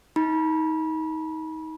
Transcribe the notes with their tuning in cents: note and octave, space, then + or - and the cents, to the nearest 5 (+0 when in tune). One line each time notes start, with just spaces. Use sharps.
D#4 +25 B5 -35